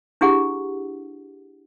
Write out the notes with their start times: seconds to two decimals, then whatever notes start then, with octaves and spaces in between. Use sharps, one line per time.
0.21 D4 E4 G4 G#4 F#5